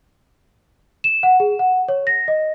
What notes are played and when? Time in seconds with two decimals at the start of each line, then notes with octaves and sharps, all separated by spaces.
1.04 E7
1.23 F#5
1.40 G#4
1.59 F#5
1.88 C#5
2.07 A#6
2.28 D#5